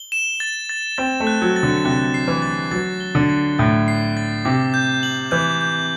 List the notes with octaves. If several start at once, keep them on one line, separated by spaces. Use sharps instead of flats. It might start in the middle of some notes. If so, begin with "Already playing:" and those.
Already playing: G7
E7
A6
A6
C4 A6
A3
F#6
F#3
A6
D3
C3 F#6
C7
E3
A6
F#3 A6
G7
D3
A6
A2 A6
C7
A6
C3 D6
G6
F#7
E3 G6
G6